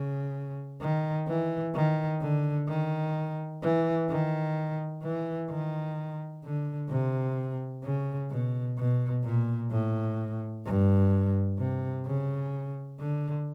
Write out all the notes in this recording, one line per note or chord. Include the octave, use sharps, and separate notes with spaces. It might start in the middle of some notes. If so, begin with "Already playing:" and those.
Already playing: C#3
D#3
E3
D#3
D3
D#3
E3
D#3
E3
D#3
D3
C3
C#3
B2
B2
A#2
A2
G2
C3
C#3
D3